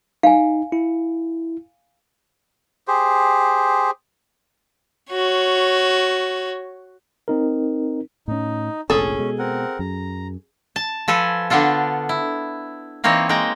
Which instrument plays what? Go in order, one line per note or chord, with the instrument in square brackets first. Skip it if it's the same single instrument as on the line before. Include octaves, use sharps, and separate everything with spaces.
[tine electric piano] D#4 [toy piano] F5 G#5
[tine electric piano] E4
[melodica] G4 G#4 C5
[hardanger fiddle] F#4 C#5
[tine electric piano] C4 D#4 A#4
[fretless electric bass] A2 C#4 [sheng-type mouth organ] D#4
[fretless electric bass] F1 A#1 [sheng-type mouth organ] C#4 [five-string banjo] G#4 A4
[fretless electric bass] B2 G#3
[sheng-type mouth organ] C4 A#4 F#5
[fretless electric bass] F#2 [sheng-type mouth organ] A#5
[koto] A5
F3 A4 B4 G#5
D3 B3 D4 F4 A4
E4
E3 A#3 C4 D#4 C#5
G#3 A#3 G5 A#5